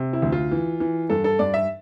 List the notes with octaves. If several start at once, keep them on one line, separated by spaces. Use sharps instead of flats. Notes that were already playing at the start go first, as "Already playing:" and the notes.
Already playing: C3
E4
D2
F4
E3
E3
G2 A4
A4
G2 D5
E5